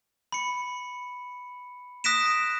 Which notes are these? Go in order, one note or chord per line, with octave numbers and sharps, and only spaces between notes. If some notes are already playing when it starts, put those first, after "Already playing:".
B5 C#7
D#6 F#6 A#6 B6 D7 E7